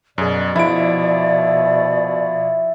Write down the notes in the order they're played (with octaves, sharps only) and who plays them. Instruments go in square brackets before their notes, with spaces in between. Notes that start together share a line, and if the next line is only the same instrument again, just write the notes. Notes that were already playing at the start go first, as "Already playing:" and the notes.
[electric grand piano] F#2 G#4 [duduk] B2 [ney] D5
[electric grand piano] F3 D7 [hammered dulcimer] E4